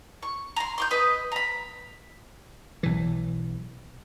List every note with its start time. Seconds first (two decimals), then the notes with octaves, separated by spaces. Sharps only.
0.23 C#6
0.56 A#5 C6
0.78 C6 D6 G6
0.91 B4 D#5
1.32 A#5 B5
2.83 B1 E3